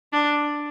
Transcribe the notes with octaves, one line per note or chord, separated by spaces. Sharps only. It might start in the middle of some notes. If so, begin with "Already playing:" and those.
D4